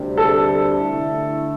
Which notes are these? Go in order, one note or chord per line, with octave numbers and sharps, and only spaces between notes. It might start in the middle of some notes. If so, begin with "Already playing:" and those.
Already playing: D2 C3 G3 D4
A4
D3 A3 E4